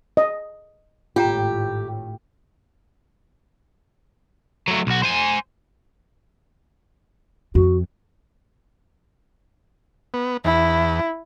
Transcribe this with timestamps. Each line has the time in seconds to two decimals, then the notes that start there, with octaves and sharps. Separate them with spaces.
0.17 D#5
1.16 G#1 A2 F4 G4 G5 A#5
4.68 F#3 A3
4.87 B1 F#4
5.03 C5 G#5
7.55 F2 F#4
10.14 B3
10.45 E2 E4